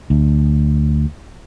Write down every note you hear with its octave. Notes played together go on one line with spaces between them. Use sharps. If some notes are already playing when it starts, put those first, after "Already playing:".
D2